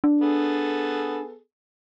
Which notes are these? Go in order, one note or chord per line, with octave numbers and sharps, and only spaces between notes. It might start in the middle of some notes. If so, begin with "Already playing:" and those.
D4
B3 G#4 A4